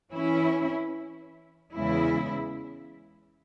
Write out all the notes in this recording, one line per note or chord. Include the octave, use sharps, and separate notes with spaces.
E3 C#4 E4
E2 C#3 G#3 E4